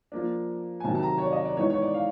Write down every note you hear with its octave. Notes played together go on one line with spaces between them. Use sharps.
F3 A#3 D4
G#5
C3 D#3 F#3 A5
A5
A#5
C#5
D5
D#5
D5
E3 G#3 B3 D#4 C#5
C#5
D5
F5